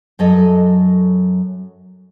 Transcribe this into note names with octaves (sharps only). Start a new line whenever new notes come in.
F#2 F#3 A4 D#5